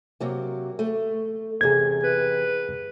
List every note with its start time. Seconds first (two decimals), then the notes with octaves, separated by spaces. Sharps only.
0.20 C3 F#3 A#3
0.79 A3
1.61 E2 C3 G#4 G#6
2.04 B4